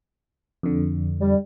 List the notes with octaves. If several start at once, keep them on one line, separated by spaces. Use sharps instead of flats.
F2 D3
G3